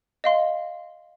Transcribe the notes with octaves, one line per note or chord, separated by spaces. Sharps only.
D#5 F5 C6